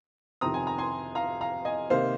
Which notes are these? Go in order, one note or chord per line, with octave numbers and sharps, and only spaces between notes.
F2 C3 D#3 C4 A#5 D#6
G#5
A#5
G#5 C6
F5 A#5
F5 A#5
D#5 G#5
C3 D#3 A#3 D#4 C5 F5